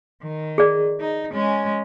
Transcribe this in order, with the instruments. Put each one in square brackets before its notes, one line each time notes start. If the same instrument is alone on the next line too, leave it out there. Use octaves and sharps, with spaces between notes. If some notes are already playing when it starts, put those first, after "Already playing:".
[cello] D#3
[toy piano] G#4 D5
[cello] D#4
G#3 C#4